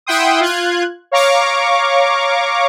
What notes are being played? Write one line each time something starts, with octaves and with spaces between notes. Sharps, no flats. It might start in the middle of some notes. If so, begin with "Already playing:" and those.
E4 E5 F#5 G5 C6 D#6
F4 F#6 G#6
C#5 F5 A#5 C#6 D6